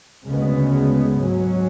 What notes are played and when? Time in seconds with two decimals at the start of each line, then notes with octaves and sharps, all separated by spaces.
0.23 D2 C#3 G#3 B3
1.15 G#2 F#3 C#4